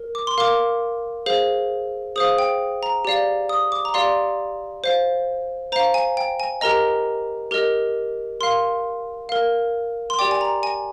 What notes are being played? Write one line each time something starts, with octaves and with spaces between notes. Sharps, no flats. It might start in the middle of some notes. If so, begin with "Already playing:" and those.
Already playing: A#4
D6
C6
A#4 F5 D6
G#4 C5 F5
G#4 C5 F5 D#6
G5
A#5
G4 D5 F5
D#6
D6
A#5
G4 D5 F5 C6
C5 F5
C5 F5 A#5
G#5
G5
G#5
G4 A#4 D#5 A#5
G4 A#4 D#5
A#4 F5 C6
A#4 F5
C6
G4 D5 G5 D6
G#5
A#5
G#5